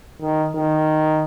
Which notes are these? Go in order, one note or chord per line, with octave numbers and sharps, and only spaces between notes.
D#3
D#3